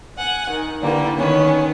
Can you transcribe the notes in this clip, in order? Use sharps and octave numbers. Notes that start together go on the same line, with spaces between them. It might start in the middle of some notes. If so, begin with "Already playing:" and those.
F#5 G#5
D#3
D3 E3 G3 A#3
D#3 B3 C#4